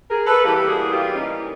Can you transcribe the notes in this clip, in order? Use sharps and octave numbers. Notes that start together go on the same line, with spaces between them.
G#4 A#4
A4 B4
A2 E3 G3 A#3 G4 A4
F#4 G#4
F4 G4
C#4 D#4